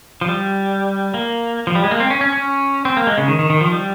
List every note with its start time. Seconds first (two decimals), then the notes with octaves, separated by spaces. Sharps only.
0.21 F3
0.28 G3
1.14 A#3
1.67 F3
1.75 G3
1.84 G#3
1.91 A#3
2.00 C4
2.10 C#4
2.21 C#4
2.33 C#4
2.85 C4
2.97 A#3
3.07 G#3
3.18 C#3
3.28 D#3
3.39 D#3
3.50 D#3
3.61 F3
3.71 G3